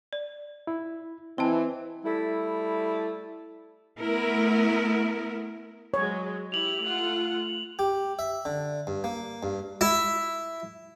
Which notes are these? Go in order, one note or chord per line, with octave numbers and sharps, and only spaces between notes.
D5
E4
E3 C4 E4 C5 D#5 A5
G3 A3 E4
A3 B3 E4 A#4
F#3 G#3 C#5
E4 G4 F7 F#7
A3 F4 F#5
G4
E5
D3
G2
A#3
G2
E4